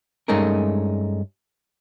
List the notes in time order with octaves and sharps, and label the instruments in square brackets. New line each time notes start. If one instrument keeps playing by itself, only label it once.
[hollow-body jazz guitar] G2 G#3 A3 C#4 D#4 A#4